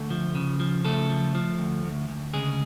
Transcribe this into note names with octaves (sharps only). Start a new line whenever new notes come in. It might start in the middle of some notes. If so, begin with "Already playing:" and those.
Already playing: D2 A3 A4
F3
C#3
F3
C#3 A3 A4
F3
F3
D2
D2
D2
C#3 G#3 G#4